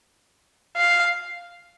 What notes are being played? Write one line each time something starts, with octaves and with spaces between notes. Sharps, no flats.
F5